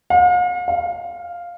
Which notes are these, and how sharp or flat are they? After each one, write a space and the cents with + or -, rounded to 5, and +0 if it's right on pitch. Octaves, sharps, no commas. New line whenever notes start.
F5 +45
F5 +0